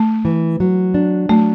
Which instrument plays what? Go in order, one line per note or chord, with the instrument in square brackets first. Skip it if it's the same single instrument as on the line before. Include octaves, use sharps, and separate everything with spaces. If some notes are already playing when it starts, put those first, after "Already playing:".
Already playing: [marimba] A3
[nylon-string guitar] E3
F#3
D4
[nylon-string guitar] F#3 [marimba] A3